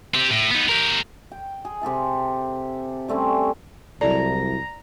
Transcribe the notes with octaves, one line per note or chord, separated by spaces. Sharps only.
C4 G4
A2
B3 D#4
G4 A#4
G5
G#4
C3 G4 A4 E5
G3 A3 C4 C#4
C2 F#3 E4 A4 D5 A#5